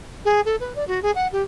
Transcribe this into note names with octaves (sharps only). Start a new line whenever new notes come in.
G#4
A4
B4
D5
F#4
G#4
F#5
G4